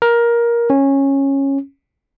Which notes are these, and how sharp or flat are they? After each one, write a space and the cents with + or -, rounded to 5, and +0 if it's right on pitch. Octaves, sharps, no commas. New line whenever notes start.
A#4 +15
C#4 -15